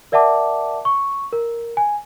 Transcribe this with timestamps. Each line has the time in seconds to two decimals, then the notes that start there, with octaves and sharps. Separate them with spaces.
0.12 A#4 D5 E5 F#5 A5 D6
0.85 C#6
1.33 A#4
1.77 G#5